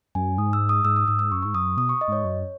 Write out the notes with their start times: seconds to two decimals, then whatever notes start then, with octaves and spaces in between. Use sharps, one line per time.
0.15 F#2 G#5
0.38 G#2 D#6
0.53 E6
0.69 D#6
0.84 G#2 E6
0.96 D#6
1.08 G#2 E6
1.19 E6
1.32 F#2 C#6
1.42 G#2 C#6
1.54 F#2 D#6
1.77 B2 D#6
1.89 C#6
2.01 D#5
2.08 G#2 C#5
2.24 F#2